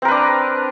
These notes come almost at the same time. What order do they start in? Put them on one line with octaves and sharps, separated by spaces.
C4 A#4 B4 D4